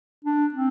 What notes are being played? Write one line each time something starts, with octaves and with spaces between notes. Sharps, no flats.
D4
C4